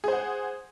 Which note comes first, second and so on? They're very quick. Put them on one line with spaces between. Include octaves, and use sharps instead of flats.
G#4 C5 F#5